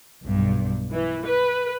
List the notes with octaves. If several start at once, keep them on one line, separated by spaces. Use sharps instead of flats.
B1 G2
E3
B4